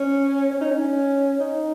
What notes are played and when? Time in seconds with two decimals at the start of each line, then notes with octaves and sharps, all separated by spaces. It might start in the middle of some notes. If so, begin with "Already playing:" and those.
Already playing: C#4
0.52 C#4
0.61 D#4
0.71 C#4
1.40 D#4